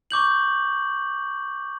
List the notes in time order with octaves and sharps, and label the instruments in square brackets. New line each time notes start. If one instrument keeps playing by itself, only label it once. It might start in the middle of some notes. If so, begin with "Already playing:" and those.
[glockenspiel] C#6 D6 G6 F#7